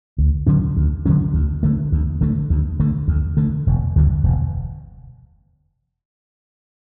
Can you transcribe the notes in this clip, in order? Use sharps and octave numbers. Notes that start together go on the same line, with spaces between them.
D2
D3 F#3 C#4
D2
D3 F#3 C#4
D2
D3 A3
D2
D3 A3
D2
D3 A3
D2
D3 A3
E1
D2 D3 G3
E1